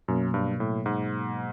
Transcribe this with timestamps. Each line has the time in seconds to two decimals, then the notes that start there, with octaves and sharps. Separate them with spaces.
0.08 F#2 B2 F#3 A#3
0.34 G2
0.60 A2
0.86 G#2